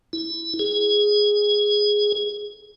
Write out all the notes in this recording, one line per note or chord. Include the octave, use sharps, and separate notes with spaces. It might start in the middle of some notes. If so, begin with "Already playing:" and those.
E4
G#4